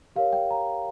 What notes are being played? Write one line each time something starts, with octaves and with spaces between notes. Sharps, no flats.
G4 A#4 C#5 F5
G5
A#5